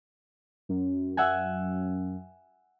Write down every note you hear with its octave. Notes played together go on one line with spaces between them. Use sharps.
F#2
E5 F#5 G#5